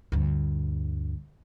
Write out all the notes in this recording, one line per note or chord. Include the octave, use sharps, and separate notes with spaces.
D2 G2